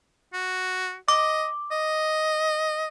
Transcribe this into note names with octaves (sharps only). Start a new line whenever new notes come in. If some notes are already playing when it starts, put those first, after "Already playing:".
F#4
D#5 D6
D#5